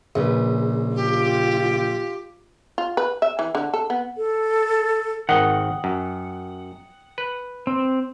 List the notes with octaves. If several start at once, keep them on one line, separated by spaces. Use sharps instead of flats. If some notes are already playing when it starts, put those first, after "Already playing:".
A#1 C#3 G#4 B4
F4 G4
F4
B4
E5
E3
D3
A4
B3
A4
G#1 D#3 F#5 G5 D#6 G7
F#2
B4
C4